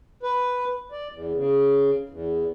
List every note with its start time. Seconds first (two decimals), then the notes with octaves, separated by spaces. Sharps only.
0.23 B4
0.92 D5
1.12 E2
1.35 C#3
2.09 E2